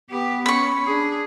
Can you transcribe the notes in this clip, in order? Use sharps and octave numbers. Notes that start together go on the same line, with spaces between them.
B3 G4 B4
C#4 B5 C#6
D4 G#4